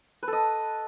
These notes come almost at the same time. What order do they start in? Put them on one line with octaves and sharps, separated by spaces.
B4 A4 D#5